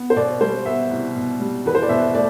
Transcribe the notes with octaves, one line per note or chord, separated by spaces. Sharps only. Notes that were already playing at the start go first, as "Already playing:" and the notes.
Already playing: B3
C5
B2 D5
G3 C5
B3 E5
C2
B2
G3
E2 B4
C5
D5
B2 E5
A3 D5